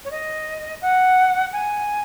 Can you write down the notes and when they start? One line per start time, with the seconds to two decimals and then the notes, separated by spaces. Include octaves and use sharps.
0.04 C#5
0.10 D#5
0.81 F#5
1.52 G#5